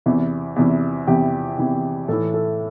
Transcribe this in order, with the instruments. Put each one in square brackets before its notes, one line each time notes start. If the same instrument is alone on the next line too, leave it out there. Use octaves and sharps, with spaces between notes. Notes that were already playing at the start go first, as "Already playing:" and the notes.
[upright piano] E2 C3 E3
E2 C3 E3
E2 C3 E3 G4
E2 C3 E3
A2 E3 A4
A4